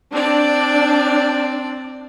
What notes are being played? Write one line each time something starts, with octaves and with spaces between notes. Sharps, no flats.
C4 D4 D5